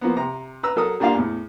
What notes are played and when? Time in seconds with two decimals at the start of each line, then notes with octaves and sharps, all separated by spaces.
0.01 F3 A#3 B3
0.16 C3 A#5
0.63 B4 A#5 E6
0.76 F#3 A4 A#4 D#6
1.00 G3 A#3 D4 F4 F5
1.14 E2 A2